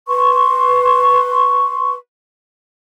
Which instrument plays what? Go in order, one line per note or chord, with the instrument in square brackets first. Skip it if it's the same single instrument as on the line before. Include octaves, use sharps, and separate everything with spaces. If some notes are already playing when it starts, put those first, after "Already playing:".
[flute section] B4 C6 C#6